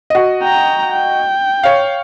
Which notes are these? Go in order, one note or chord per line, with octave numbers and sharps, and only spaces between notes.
F#4 D#5
G5 A#5
G5
C#5 F5